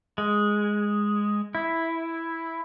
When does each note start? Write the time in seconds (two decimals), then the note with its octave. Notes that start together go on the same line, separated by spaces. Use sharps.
0.18 G#3
1.55 E4